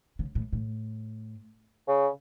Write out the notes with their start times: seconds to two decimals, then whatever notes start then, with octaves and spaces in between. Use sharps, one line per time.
0.19 C#3
0.35 A2
0.53 A2
1.88 C#3